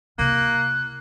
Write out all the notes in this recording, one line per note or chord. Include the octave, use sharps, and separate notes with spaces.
C3 A#3 E4 F#6